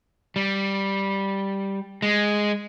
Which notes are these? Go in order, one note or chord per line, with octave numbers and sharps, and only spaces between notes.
G3
G#3